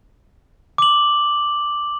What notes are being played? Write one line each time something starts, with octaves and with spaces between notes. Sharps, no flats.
D6 F#7